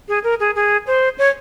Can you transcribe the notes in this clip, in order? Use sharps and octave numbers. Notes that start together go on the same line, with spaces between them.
G#4
A#4
G#4
G#4
C5
C#5